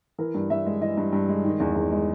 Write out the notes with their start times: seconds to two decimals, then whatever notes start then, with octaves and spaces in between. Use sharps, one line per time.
0.18 E3 A#4
0.34 G2
0.50 G2 E5
0.66 G#3
0.81 E3 D#5
0.97 G2
1.13 G2
1.29 G#3
1.44 D#3
1.60 E2
1.76 E2
1.91 G#3